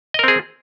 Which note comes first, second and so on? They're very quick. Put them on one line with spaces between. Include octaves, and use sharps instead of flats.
D#5 A#4 C4 G#4